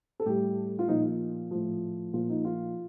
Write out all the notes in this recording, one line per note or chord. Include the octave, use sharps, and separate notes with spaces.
A4
A2 G3 G4
F4
A#2 F3 D#4
A2 F3
A#2 F3 F4
D#4
F4